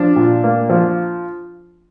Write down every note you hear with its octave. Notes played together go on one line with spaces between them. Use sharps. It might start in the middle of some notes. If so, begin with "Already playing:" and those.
Already playing: F3 D4
A#2
A#3
F3